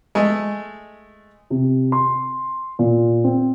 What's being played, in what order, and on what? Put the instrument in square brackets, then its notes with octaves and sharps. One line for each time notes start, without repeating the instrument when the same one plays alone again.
[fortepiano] G#3 A3
[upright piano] C3
C6
A#2
C4